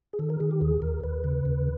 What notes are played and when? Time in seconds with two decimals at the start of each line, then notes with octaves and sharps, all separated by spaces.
0.13 G#4
0.19 D#3 A4
0.30 A#4
0.40 D#3 G#4
0.51 G4
0.61 D#2 G#4
0.82 D#2 A#4
1.04 D#2 B4
1.24 C#3
1.45 D#2